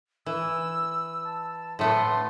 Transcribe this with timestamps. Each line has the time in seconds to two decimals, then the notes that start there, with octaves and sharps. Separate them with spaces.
0.26 E3 E6
1.25 A5
1.79 A2 A3 B3 C6